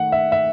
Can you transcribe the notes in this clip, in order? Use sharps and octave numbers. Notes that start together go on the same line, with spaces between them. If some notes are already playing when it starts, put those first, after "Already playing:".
Already playing: D#3 A3 F#5
E5
E5